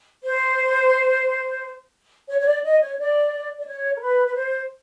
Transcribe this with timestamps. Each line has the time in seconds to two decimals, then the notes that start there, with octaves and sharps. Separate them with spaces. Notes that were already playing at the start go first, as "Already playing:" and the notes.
0.22 C5
2.29 C#5
2.39 C#5
2.46 D5
2.63 D#5
2.81 C#5
2.97 D5
3.58 D5
3.66 C#5
3.96 A#4
4.00 B4
4.26 B4
4.35 C5